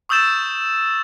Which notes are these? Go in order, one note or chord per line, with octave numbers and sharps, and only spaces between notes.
C#6 D#6 E6 G6 A6 E7